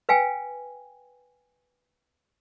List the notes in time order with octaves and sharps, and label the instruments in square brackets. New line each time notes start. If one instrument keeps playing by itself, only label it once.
[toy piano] B4 F5 G5 G#5